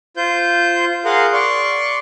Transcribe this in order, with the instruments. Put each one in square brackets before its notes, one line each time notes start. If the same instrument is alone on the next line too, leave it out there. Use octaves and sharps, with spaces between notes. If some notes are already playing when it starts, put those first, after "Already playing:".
[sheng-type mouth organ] F4 C5 G6
G#4 A#4 F5 F#5 C6
D5 C6 C#6